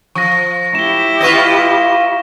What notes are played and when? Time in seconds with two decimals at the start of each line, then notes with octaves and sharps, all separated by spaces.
0.15 F3 C#6 A#6
0.75 E4 G4 E7 G7
1.21 F4 B4 D#5 C#6 A#6